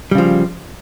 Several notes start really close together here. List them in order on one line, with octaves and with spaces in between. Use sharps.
G3 C#3 F3